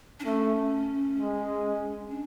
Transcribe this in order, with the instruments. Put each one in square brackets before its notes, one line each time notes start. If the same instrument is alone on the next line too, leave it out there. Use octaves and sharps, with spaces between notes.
[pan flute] D4
[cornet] A3 [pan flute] C#4
[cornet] G#3
[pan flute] D4